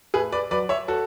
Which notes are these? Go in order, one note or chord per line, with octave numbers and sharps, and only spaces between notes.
A2 G#4 B4
B4 D5
F#3 B4 D5
C#5 E5
F#4 A4